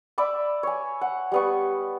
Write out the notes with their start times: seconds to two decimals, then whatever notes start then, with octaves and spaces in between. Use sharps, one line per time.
0.18 D5 E5 B5 D6
0.63 C#5 G#5
1.01 F#5
1.32 G3 B3 C#6